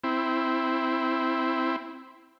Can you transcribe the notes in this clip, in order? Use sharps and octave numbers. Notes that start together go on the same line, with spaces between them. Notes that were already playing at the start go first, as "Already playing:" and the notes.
C4 E4